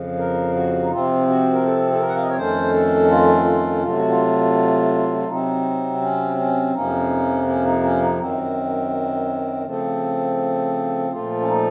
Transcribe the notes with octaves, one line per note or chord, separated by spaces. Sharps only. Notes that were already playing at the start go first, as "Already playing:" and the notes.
Already playing: F2 C#3 F3
A#4
F#4
D#4
C3 F3 C4 F4
F#4
A#4
A4
A4
A#4
F#5
F5
D#5
C#5
F2 D#3 A3 C#4 C5
A4
F4
F4
C3 F#3 A3 F4
F#4
F4
F4
C3 F#3 C4 D#4
C#4
C#4
F2 C3 F3 A#3 C#4 D#4
C#4
D#4
C#4
D#4
F#2 D#3 F#3 C4
C#3 F3 A3 C4
A#2 F3 A3 F4
C#4
D#4